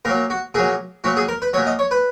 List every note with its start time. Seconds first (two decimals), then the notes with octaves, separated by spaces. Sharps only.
0.05 A#2 F#3 A#4
0.30 F#4
0.54 A#2 F#3 G#4
1.04 A#2 F#3 F#4
1.17 G#4
1.28 A#4
1.42 B4
1.53 F#3 C#5
1.57 A#2
1.67 D#5
1.79 C#5
1.91 B4